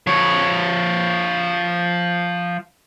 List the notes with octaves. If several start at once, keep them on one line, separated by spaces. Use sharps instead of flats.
F3 C#5